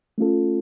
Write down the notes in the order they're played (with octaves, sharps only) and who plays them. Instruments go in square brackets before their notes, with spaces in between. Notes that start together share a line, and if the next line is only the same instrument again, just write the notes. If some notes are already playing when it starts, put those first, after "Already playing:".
[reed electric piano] A3 C#4 F4 A4